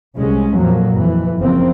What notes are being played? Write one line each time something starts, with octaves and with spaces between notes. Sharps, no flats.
C2 G#3 C#4
F2 A#2 F3 F#3 A#3
F2 E3
F#1 C#3 F3 A#3 C4